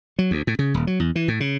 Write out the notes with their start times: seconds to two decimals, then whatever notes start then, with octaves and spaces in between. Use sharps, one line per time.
0.19 F#3
0.31 D2
0.47 A2
0.59 C#3
0.74 D#1
0.87 F#3
1.00 E2
1.15 E3
1.28 A2
1.40 C#3